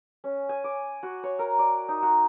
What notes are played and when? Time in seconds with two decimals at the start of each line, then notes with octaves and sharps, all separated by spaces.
0.24 C#4
0.49 G#5
0.64 D6
1.03 F#4
1.23 C#5
1.39 A#4
1.59 D5
1.88 D#4
2.02 F#4